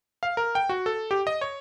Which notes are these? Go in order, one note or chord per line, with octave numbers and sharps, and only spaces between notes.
F5
A#4
G5
F#4
A4
G4
D#5
C#5